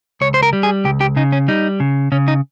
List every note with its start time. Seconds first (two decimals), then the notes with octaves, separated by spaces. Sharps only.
0.21 C#2 C#5
0.34 C5
0.43 A#4
0.53 G3
0.63 G#4
0.84 C#2 G4
1.01 G4
1.16 C#3 D#4
1.32 C#4
1.48 G3 D#4
1.80 C#3
2.12 C#3 C#4
2.28 D#4